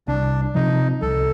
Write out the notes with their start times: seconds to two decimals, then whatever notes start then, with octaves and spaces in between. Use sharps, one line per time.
0.08 C2 D4
0.55 C3 F3 D#4
1.02 C2 A4